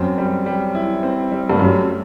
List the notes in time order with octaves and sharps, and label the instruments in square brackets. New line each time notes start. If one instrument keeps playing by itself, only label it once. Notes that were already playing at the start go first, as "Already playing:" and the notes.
Already playing: [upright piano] F#2 [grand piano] C4
[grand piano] G3
G3
E4
C4
G3
[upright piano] G2
[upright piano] F#2 [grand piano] A3